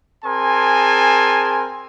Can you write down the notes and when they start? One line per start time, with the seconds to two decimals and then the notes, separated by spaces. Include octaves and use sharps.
0.25 C4 G#4 A#4 G#5 A5 C6